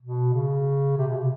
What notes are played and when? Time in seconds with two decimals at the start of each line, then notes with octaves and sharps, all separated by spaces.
0.01 B2
0.33 C#3
0.98 C3
1.08 B2
1.18 C3